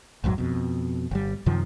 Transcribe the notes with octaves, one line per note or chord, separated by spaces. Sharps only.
A#1 E2 G#2 F#3
F2 B2
G1 G3
F#2 C3 D#3 F3